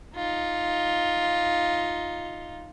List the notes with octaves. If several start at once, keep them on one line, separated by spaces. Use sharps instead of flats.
D#4 F4